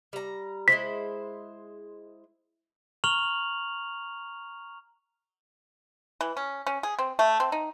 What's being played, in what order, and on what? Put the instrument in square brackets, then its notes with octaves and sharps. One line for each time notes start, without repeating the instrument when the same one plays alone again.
[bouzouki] G3 A#5
[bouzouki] G#3 E4 C5 [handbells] B6
[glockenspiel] A#5 C#6 F6 F7 F#7
[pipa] E3
C#4
C#4
G#4
C4
A3
C4
D#4